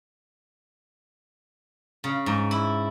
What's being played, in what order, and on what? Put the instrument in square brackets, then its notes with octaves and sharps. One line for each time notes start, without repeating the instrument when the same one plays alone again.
[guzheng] C#3
G#2
E4